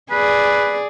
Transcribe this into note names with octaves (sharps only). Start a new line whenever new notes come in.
G#4 B4 D5